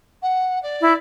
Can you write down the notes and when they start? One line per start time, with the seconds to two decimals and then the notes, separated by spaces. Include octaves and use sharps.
0.22 F#5
0.62 D5
0.81 E4